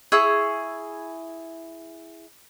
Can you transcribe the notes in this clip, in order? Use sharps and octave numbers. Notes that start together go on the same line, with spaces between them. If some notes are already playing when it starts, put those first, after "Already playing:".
E4 G#4 C#6 E6